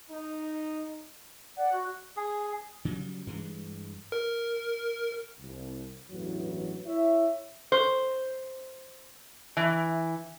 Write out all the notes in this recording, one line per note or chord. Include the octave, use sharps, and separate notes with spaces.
D#4
D5 F#5
F#4
G#4
C#3 F#3 G3
G2 E3 G#3
A#4
C2
A1 E2 G2 E3 F#3
E4 C#5 E5
C5
E3